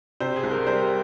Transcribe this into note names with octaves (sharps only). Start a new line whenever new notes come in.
C3 C5
G#4
C2
A#4
G3 C5